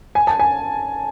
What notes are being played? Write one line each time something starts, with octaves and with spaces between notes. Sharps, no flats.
G#5
A5
G#5